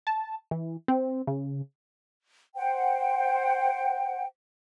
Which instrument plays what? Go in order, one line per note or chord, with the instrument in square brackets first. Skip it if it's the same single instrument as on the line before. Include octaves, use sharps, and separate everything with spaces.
[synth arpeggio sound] A5
E3
C4
C#3
[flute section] C5 F#5 G5